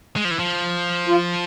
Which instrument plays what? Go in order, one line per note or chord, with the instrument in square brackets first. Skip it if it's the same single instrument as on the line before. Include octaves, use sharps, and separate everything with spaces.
[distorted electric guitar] G#3
F3
E3
F3
[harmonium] F4